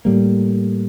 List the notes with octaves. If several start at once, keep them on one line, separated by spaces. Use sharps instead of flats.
A2 G3 A#3